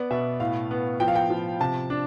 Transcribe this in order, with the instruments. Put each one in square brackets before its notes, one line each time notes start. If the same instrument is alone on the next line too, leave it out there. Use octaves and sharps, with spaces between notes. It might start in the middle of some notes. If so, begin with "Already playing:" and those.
Already playing: [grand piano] B3 D5
B2 E5
A2 F5
B3
F3 G5
F5
G5
F3
C3 A5
D4